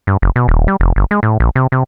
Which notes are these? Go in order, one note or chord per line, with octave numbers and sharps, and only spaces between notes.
G2
F#1
B2
D#1
G3
F1
G1
G#3
A2
A#1
C3
C3